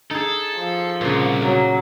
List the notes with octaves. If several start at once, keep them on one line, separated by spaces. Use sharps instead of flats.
D#4 G#4 A4
F3
C2 A#2 C#3
F#3 A#4